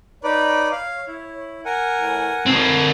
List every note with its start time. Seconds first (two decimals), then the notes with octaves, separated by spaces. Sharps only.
0.24 D#4 B4 C#5 D5
0.72 F5
1.07 E4
1.65 A#4 F#5 G#5
1.99 A2 E3
2.46 D2 C4 A#4 C#5